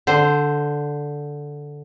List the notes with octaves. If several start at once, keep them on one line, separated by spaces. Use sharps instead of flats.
D3 C5